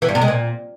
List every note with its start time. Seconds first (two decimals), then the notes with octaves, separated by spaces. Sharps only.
0.02 E3
0.08 G2
0.15 C3
0.21 G#3
0.28 A#2